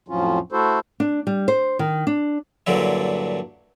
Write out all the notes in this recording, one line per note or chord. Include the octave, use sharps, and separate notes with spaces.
F2 A2 F3 F#3 C#4 F4
A3 E4 F#4 A4 C5
D4
G3
C5
D#3
D4
G2 A#2 D3 F#3 E4